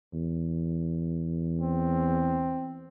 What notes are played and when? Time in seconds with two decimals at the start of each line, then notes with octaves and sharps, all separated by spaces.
0.14 E2
1.61 C4